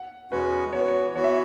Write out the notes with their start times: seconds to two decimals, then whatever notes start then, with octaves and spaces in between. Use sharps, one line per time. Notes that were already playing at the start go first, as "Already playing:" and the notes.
Already playing: F#5
0.31 E2 B2 G#3 C#4 F#4 B4
0.73 E3 B3 F#4 C#5
0.81 B4
0.88 C#5
1.15 E3 B3 F#4 C#5
1.24 E5